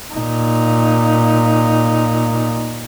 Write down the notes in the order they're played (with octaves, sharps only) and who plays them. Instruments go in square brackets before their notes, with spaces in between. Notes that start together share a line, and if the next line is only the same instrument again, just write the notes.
[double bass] A#2 D#4